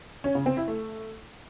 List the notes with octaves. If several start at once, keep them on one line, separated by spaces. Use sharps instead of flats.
C#4
C#3
C4
E4
A3